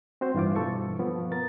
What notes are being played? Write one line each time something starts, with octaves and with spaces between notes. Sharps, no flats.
C4 F#4 C5
G2 E3 F4 D6
G2 B2 A4 C#6
F3 B3
B3 A#4 A6